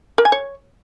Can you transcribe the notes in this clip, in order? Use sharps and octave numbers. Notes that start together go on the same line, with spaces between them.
A#4
G#5
C#5